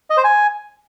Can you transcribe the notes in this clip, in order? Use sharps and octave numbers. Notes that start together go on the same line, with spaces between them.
D#5
C5
G#5